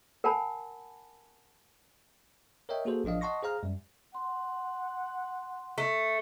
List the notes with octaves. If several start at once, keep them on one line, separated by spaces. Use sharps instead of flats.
A#4 F#5 G#5 A5 B5
A#4 C#5 D#5 E5 G5
A#3 F#4 G#4 A4 C5
A1 F3 D4 D#5 F5
D#5 F#5 A5 C6 C#6 A#6
G#4 C5 F5 A#5 F6
F#2 G3
F#5 C6
A3